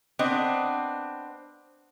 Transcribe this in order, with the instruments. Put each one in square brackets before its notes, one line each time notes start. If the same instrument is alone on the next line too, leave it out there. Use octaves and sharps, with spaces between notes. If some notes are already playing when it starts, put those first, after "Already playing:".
[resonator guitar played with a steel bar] B3 C4 D4 D#5